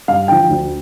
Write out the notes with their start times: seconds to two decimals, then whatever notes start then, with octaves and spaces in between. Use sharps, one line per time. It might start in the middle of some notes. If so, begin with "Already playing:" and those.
0.08 G2 F5
0.28 D3 F3 G5
0.49 D2